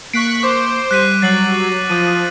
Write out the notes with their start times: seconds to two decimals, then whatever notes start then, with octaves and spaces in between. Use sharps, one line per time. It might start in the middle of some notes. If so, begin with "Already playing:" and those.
0.13 A#3 C#6 F#6 B6 C7 D7
0.43 C5 D6
0.91 G3 F#6 B6 D#7
1.22 F#3 A6 C7 F#7
1.89 F3 D#6 D#7